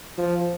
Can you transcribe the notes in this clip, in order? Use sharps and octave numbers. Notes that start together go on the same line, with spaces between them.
F3